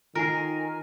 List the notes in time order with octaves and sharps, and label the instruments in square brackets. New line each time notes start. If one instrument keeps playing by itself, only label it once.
[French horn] D#3 [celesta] F4 C7 [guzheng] A#4 [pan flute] G#5